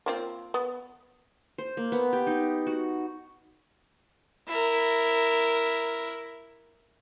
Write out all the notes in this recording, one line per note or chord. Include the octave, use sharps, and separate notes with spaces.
A#3 C4 F4
B3
C5
A#3
B3
G4
D#4
F#4
E4 A#4